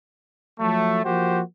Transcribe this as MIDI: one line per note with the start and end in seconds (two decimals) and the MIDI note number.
0.60 1.03 53
0.60 1.03 54
0.60 1.03 57
1.05 1.41 53
1.05 1.41 58
1.05 1.41 66
1.05 1.41 67
1.05 1.41 72